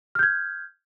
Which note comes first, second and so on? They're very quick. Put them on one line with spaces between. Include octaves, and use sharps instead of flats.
F6 G6 G#6